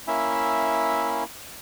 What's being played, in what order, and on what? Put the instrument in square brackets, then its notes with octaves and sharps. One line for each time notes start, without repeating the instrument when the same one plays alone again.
[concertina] A#3 C#4 E4 E5